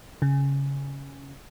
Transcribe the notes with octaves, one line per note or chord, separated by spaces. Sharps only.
C#3